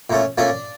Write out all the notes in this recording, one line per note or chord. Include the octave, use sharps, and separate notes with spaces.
A#2 A3 C#4
A#2 A3 C#4 D4